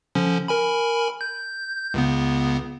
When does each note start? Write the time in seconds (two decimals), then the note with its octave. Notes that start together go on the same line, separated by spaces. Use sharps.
0.15 D3 F3 C#4
0.48 A#4 G#5 B5
1.21 G6
1.94 C#2 C#3 B3